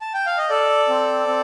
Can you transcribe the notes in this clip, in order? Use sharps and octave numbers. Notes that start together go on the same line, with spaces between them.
A5
G5
F5
D#5
A4 D5
C4
C4